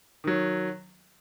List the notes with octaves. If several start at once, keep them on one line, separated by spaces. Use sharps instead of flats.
D#3 F#3